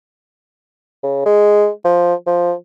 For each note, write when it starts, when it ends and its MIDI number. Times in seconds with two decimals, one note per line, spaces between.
1.03 1.25 49
1.25 1.69 56
1.84 2.14 53
2.26 2.53 53